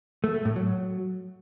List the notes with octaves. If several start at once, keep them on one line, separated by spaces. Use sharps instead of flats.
A3
A3
A2
F#3